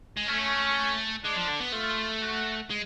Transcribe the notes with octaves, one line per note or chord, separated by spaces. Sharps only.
G#3
A3 C#4
G#3 D4
F3
D3
B3
A3 F4
F#4
G#3